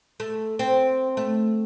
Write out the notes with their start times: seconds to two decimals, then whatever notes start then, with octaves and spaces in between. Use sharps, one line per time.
0.20 A3
0.59 C4
1.17 A3